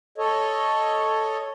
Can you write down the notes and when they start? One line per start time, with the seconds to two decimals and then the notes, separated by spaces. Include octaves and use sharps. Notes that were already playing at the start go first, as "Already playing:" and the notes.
0.18 A4 C#5 D#5